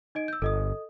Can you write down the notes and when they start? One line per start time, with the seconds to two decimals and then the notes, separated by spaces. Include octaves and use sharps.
0.15 D#4 D#5 D7
0.28 E6 G6
0.42 G1 A4 D#5 D#6